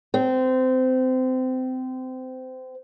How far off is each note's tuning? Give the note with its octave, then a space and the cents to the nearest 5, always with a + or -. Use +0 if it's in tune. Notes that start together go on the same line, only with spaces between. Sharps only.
C4 -25